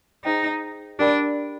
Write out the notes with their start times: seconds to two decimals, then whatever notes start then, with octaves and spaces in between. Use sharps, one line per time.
0.24 D#4 G#4 C5 D#5 G5
0.99 D4 G4 A#4 D5 G5 B5